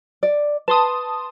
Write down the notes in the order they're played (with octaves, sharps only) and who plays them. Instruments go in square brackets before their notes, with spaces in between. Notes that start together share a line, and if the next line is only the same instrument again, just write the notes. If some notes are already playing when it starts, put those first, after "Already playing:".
[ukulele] D5
[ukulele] B4 [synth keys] A5 C6 D#6